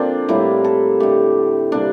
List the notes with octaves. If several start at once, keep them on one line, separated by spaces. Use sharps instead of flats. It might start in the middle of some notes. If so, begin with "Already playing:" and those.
Already playing: D3 F3 A#3 C4 D4 F4 A#4
A2 G3 A#3 E4
A4
D3 A3 G4
C3 G3 A#3 D4